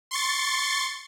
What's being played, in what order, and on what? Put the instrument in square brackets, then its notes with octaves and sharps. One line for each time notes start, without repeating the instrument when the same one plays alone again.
[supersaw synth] C6 C#6 A6